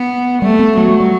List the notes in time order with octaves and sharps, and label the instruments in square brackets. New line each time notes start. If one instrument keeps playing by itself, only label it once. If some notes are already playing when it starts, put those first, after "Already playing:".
Already playing: [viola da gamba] B3
[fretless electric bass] G3 [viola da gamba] A3
[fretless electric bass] B3
[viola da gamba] F#3 [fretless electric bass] A3
[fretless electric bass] G3
G3